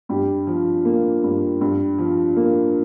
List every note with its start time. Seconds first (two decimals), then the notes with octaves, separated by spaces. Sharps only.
0.09 G2 G4
0.47 F3
0.85 A#3
1.24 G2
1.61 G2
1.98 F3
2.37 A#3